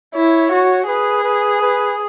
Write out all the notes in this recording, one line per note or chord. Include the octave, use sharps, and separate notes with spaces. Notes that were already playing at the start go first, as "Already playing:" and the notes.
E4 C#5
F#4
G#4 B4
B4
B4